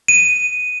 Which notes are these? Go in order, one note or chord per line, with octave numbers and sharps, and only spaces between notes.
D#7